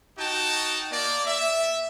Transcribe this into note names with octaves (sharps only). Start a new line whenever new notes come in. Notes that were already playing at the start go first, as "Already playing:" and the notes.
D#4 F#4 G5 A5
A#3 D5
E5